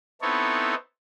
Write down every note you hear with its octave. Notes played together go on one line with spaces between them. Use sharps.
B3 C4 D#4 E4 A4 C#5